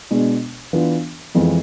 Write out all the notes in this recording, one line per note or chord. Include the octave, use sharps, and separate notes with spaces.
B2 G#3 D4
E3 B3 D4 F4
F2 E3 G#3 C4 F4